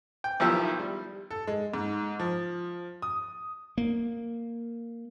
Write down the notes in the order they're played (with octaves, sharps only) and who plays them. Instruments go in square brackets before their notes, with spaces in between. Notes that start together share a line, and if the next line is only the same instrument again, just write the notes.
[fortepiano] G5
B1 D#3 F3 E4 G4 E5
G3
[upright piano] A4
G#3
G#2
F3
D#6
[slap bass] A#3